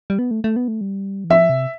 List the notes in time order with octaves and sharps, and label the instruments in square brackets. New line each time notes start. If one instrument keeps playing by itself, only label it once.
[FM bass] G3
B3
A3
A3
B3
A3
G3
E3
[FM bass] F3 [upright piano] E5
[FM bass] C3